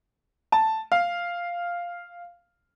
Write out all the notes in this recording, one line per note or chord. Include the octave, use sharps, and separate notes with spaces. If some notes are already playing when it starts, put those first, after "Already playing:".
A5
F5